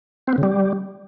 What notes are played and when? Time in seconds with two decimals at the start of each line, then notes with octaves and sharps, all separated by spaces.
0.28 C4
0.33 B3
0.38 C#3
0.43 G3